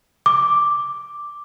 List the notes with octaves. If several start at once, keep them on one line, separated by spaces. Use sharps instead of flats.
D6